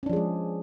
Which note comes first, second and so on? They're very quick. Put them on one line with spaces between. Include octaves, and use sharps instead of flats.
C#4 D4 F3 G#4 G#3